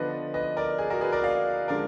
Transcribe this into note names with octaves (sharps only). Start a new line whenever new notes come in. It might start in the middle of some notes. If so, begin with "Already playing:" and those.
Already playing: D3 F3 B3 D4 B4 D#5
B4 D#5
A#4 D5
G#4
F#4 A#4
G#4 B4
A#4 D5
D5 F5
D3 F3 G#3 D4 A#4 D5